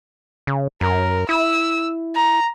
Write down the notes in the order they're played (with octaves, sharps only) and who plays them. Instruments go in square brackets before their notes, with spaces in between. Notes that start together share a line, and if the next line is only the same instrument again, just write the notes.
[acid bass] C#3
[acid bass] F#2 [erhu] A#4
[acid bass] E4 [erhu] E6
[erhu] A#5